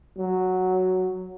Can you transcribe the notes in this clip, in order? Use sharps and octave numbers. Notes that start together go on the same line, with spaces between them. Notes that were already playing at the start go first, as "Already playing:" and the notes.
F#3